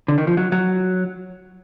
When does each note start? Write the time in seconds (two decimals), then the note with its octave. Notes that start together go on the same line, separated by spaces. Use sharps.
0.08 D3
0.18 D#3
0.27 F3
0.37 F#3
0.52 F#3